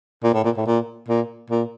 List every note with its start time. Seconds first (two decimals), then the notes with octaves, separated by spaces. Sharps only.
0.23 A#2
0.33 A2
0.44 A#2
0.57 A2
0.67 A#2
1.08 A#2
1.50 A#2